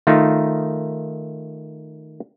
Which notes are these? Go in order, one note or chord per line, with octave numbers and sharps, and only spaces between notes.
D#3 A3 D#4 F4 A#4